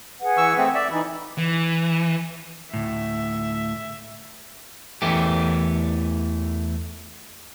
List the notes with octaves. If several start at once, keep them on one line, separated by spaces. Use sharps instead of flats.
G#4 B4 F#5
E3 C#6 E6
A3 C4
D5 E5
E3 D#4 B5
E3
D2 A2 E5
E2 E3 A3 G4